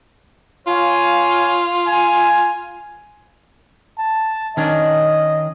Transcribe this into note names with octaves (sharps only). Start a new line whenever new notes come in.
F4 C#5 F5 G#5
G#5
A5
D#3 C#4 D4 D#5